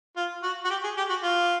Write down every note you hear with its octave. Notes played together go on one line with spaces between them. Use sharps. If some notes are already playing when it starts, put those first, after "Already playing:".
F4
F#4
F#4
G4
G#4
G4
F#4
F4